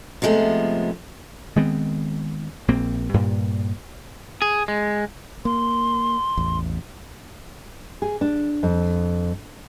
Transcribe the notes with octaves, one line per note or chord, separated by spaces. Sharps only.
C3 F3 G#3 A3 B3
D#3 G#3 B3 C4
A#1 A#3 C4
G2 A#2 G3
G#4
G#3
A#3 C6
A1 E2
G#4
D4
F2